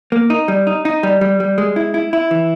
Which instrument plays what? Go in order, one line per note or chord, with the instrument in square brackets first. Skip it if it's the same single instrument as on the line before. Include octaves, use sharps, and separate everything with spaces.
[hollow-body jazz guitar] A#3
D#4
G3
D#4
D#4
G3
G3
G3
G#3
E4
E4
E4
E3